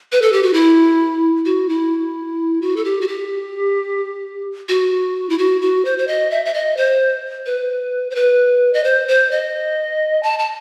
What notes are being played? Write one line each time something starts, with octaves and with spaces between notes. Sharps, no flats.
B4
A4
G4
F#4
E4
F#4
E4
F#4
A4
G4
F#4
G4
F#4
E4
F#4
F#4
C5
C5
D#5
E5
E5
D#5
C5
B4
C5
B4
D#5
C5
C5
D#5
A5
A5